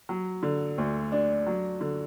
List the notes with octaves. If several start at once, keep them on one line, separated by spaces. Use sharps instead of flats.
F#3
D3
D2
D4
F#3
D3